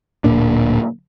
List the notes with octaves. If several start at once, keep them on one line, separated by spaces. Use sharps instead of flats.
D1 A#2 A#3 D4